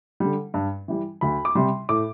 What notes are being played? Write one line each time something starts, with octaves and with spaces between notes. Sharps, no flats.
D3 G3
G2
E3 G3
D2 B5
D6
C3 G3 C6
A2 D6